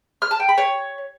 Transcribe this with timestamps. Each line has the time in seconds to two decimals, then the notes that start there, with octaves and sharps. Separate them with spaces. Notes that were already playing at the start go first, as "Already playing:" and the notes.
0.22 F6
0.31 A5
0.40 G5
0.49 B5
0.58 C#5